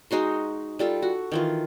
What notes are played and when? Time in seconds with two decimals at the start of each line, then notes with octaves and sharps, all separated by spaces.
0.11 G#3 D#4 F#4 C6
0.79 G3 F4 A4
1.02 F#4
1.32 D#3 E3 F4